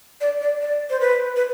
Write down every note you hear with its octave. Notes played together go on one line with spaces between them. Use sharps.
D5
D5
D5
C5
B4
B4